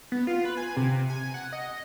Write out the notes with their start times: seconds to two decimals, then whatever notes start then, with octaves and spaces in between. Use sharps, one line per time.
0.12 B3
0.27 F4
0.45 B4
0.57 G#5
0.77 C3
1.10 G#5
1.34 F#5
1.53 D#5